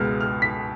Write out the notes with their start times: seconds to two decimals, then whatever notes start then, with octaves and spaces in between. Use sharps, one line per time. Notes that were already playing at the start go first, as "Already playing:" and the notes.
Already playing: C#2 B2 G#3 B3 F6
0.21 F6
0.42 B6